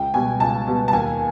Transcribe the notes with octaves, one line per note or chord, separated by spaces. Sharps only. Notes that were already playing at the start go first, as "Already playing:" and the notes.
Already playing: C#2 G5
B2 G3 B3 G#5
C#2 A5
B2 G3 B3
A5
D#2 G#5